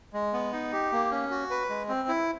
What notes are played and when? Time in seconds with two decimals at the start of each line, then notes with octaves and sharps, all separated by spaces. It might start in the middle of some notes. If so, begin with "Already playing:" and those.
0.13 G#3
0.33 B3
0.53 D#4
0.72 G4
0.92 A#3
1.11 C#4
1.31 F#4
1.50 B4
1.70 G#3
1.89 C4
2.08 E4